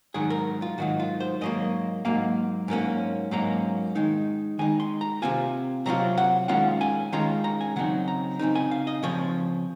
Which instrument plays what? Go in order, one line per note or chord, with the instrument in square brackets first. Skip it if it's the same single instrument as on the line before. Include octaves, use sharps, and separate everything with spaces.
[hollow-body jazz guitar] G#2 D#3 F#3 G#4
A#4
F4
G#2 D#3 F#3 F#4
F4
C5
G#2 F#3 A#3 D#5
G#2 F#3 A#3 F5
G#2 F#3 A#3 C#4
G#2 F#3 A#3 C#4 A#5
D#3 G#3 D#4
D#3 G#3 D#4 G#5
C6
A#5
C3 F#3 C4 F4 G#5
C3 F#3 C4 F4 A#5
F#5
D#3 G#3 C#4 F4 F#5
G#5
D#3 G#3 C#4 F4 A#5
A#5
G#5
C#3 F#3 C4 D#4 F#5
A#5
C#3 F#3 C4 D#4
G#5
F5
D#5
C#3 F3 C4 C#5